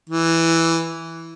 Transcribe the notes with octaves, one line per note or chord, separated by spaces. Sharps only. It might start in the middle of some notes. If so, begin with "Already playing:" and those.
E3